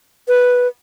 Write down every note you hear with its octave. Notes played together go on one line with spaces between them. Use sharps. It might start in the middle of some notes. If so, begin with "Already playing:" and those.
B4